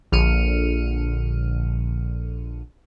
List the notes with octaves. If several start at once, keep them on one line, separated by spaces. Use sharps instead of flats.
A#1 D3 F6 C#7 D#7